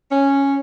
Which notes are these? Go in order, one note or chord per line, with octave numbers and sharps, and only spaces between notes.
C#4